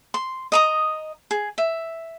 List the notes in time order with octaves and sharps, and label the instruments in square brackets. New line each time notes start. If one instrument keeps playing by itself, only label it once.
[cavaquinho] C6
D#5 A#5 D#6
G#4
E5